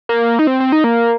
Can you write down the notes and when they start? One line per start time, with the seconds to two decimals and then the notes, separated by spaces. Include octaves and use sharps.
0.09 A#3
0.39 D#4
0.47 C4
0.60 C4
0.72 D#4
0.84 A#3